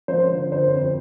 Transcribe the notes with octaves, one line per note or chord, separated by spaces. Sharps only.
F3 C5
D3
G1 C5
F2